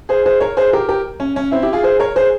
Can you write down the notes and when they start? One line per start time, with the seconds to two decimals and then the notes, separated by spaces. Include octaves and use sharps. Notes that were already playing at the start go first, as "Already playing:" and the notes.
0.09 G#4 C5
0.26 G#4 C5
0.40 A#4 C#5
0.57 G#4 C5
0.73 G4 A#4
0.89 G4 A#4
1.20 C#4
1.36 C#4
1.51 C4 E4
1.62 E4 G4
1.73 F4 G#4
1.83 G#4 C5
2.00 A#4 C#5
2.16 G#4 C5